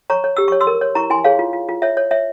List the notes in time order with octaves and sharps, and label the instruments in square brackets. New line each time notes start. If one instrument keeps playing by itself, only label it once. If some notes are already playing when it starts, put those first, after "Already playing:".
[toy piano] C#5 A#5 C#6
C#5
G4 E6
C#5 C#6
C6 E6
A#4
C#5
E4 A#5 C#6
E4 G#5 C6
G#4 C#5 F5
F4
F4
F4
C#5 E5
C#5
C#5 E5